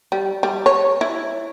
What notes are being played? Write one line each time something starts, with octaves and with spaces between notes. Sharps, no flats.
G3
G3
C#5
E4